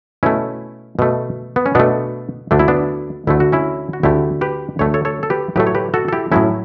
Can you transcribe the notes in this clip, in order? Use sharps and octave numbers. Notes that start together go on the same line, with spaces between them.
B2 A3 C#4 E4
B2 A3
B3
C#4
B2 A3 B3 D4
D2 D3 A3 D4
E4
B3 D4
D2 D3 A3 E4
F#4
C#4 E4
F#4
D2 D3 A3 E4 G4
G4 B4
D2 D3 A3 C#5
A4 C#5
A4 C#5
A4
G4 B4
A2 F#3 A3 G4 B4
C#5
G4 B4
F#4 A4
A4
E4 G4
A2 F#3 A3 C#4 E4